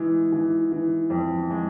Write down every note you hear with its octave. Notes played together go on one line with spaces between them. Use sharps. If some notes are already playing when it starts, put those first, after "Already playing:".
Already playing: E3 G#3
E3
E3
F2
G#3